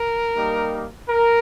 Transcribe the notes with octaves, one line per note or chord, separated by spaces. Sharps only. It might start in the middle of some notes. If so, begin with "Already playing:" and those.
Already playing: A#4
G3 A#3 D#4 G4
A#4